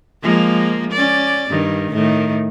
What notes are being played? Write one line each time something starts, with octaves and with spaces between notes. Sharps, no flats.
F3 G#3 A#3
C#4 D5
G2 D#3
A2 D#3